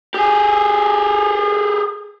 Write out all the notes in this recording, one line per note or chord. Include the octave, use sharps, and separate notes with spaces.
G4 G#4